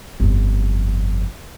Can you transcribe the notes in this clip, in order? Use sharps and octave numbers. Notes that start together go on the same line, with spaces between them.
G1 F2